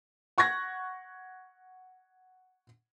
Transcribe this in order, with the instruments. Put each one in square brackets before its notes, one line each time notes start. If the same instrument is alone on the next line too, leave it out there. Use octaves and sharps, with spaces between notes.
[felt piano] F#5 C#6 F#6 G#6 A#6